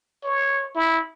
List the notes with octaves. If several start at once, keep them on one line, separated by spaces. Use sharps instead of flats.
C#5
E4